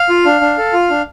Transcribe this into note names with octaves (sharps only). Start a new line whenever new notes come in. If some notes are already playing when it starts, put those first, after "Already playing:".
Already playing: F5
F4
D4
D4
A4
F4
D4